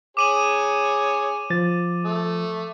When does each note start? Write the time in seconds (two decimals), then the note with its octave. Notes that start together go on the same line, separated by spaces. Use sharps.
0.17 G#4 C#5 D6 D#7 F#7
1.50 F3 A6
2.04 A3